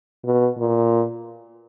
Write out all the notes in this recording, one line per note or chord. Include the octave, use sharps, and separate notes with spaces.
B2
A#2